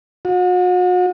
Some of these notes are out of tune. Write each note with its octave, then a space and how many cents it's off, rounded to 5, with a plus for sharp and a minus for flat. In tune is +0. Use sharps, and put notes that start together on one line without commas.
F#4 -40